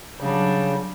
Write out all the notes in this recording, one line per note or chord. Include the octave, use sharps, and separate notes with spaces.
C#3 F#3 G3 D4